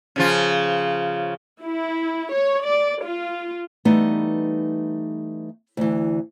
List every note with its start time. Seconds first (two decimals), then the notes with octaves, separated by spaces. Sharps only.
0.16 C#3 F3 F4
1.61 E4
2.32 C#5
2.64 D5
3.02 F4
3.85 E3 G3 A3 B3 D#4
5.77 D2 E3